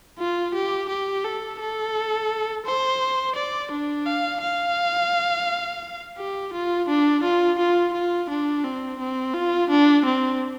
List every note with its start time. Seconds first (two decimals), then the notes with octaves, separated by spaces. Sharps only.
0.19 F4
0.54 G4
0.89 G4
1.24 A4
1.60 A4
2.66 C5
3.36 D5
3.72 D4
4.06 F5
4.42 F5
6.18 G4
6.53 F4
6.88 D4
7.23 F4
7.59 F4
7.93 F4
8.30 D4
8.64 C4
8.99 C4
9.34 F4
9.70 D4
10.05 C4